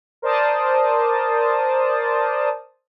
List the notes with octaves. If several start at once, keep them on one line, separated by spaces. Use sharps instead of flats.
A#4 C5 D5 A5 D#6